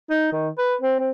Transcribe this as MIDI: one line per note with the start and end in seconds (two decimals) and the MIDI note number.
0.10 0.31 63
0.32 0.49 51
0.58 0.75 71
0.81 0.97 60
0.99 1.11 60